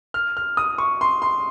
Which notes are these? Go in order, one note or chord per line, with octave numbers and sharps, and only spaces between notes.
F6
F6
D#6
C#6
C6
C6